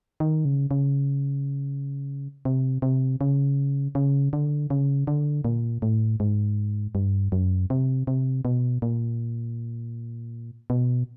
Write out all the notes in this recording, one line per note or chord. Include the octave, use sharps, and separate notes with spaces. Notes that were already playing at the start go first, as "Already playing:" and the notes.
D#3
C#3
C#3
C3
C3
C#3
C#3
D3
C#3
D3
A#2
A2
G#2
G2
F#2
C3
C3
B2
A#2
B2